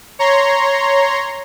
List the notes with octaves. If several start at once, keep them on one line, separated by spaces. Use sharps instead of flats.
C#5 A#5 C6